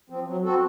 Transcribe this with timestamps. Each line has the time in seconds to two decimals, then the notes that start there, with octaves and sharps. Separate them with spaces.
0.10 F3 C4
0.27 F#3
0.44 C4 F#4 A4